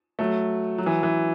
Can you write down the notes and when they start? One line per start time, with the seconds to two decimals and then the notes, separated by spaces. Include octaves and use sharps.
0.19 F#3 A3
0.78 F#3
0.86 E3
1.03 E3